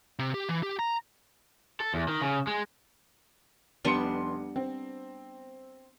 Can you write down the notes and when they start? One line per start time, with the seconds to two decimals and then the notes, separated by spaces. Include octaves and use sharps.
0.19 C3
0.34 G4
0.49 E3
0.63 G4
0.79 A#5
1.80 A4
1.94 E2
2.08 D#3
2.22 C#3
2.47 G#3
3.85 F1 G3 B3 D4 C6 C#7
4.56 C4